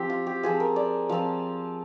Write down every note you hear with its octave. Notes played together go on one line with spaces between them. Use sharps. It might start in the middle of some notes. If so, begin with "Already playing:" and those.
Already playing: F3 C4 G4
F4
G4
F3 C4 F4 G#4
A#4
D5
F3 C4 F4 F5